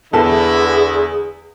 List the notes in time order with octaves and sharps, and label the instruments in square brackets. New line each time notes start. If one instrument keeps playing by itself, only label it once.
[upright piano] E2 [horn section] D3 E4 [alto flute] G#4 [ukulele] A4 B4